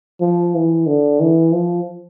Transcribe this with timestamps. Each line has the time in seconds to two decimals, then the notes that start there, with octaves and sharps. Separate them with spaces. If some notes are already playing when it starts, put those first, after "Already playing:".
0.21 F3
0.55 E3
0.87 D3
1.20 E3
1.53 F3